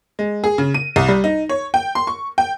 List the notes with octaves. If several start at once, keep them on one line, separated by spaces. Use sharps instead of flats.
G#3
G#4
C#3
D#7
C2
G3
D#4
C#5
G5
C6
C#6
G5